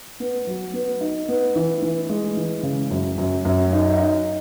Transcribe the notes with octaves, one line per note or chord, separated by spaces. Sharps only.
B3
F#3
B3
D#4
B3
E3
E3
G#3
E3
C#3
F#2
F#2
F#2
D#4
D#4